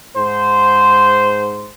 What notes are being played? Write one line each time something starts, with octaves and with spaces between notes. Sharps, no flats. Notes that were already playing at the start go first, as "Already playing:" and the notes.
G#2 C5